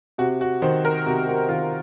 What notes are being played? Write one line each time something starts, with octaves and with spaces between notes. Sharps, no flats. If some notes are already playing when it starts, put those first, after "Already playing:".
C3 F#4
F#4
D#3 C5
A#4
C3 F#4
F#4
D#3 F4